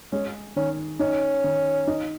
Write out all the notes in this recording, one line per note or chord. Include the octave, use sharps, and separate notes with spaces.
G#3 C#4
D#3 C#4
C#4 D#4
D#3
D#4